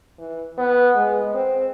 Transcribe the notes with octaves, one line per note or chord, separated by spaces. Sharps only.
E3
B3
G#3
C4